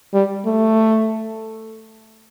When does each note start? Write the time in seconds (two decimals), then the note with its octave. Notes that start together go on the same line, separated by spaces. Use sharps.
0.13 G3
0.45 A3